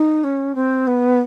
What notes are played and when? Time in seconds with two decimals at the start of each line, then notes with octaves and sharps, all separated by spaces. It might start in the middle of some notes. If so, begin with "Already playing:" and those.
Already playing: D#4
0.24 C#4
0.55 C4
0.87 B3